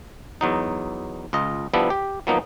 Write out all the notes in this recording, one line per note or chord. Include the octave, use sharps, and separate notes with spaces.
E2 F#3 D#4
C#2 F4 D#5
F3 G3 B3 D4 E4
G4
F3 F#3 A#3 B3 D#4